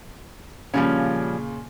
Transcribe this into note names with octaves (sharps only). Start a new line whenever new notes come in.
A#2 C#3 F3 G3 C#4